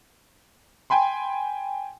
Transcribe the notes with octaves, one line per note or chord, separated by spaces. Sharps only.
G5 G#5 B5 C6